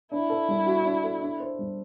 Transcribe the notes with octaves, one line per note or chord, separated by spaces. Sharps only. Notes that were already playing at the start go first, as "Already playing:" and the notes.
D4 E4
A4
G3
F#4
D4
A4
D4
C5
G3